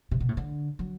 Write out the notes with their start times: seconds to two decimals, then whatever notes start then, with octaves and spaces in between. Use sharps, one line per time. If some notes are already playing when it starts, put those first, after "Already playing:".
0.11 C3
0.20 B2
0.29 A2
0.37 D3
0.79 F#3